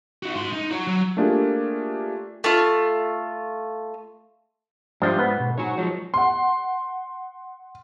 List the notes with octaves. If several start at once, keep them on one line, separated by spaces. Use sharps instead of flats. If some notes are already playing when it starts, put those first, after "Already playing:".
D#4 F#4
G#2 C6
D#4
F#4 C#5
F#3
A3 A#3 D4 F4 G4 G#4
A3 F4
G#2 F3 G3 D4 C5 E5
B3 B4
B2
G#2 F#4 C#5
F3 F#3 G#3 C#5
F#5 C6